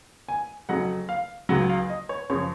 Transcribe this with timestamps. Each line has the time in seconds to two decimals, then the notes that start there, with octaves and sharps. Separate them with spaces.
0.29 G#5
0.69 F2 C#3 F#3 F#5
1.09 F5
1.49 C#2 C#3 F#3 F#5
1.69 F5
1.90 D#5
2.09 C#5
2.30 F#2 C#3 F3 C#5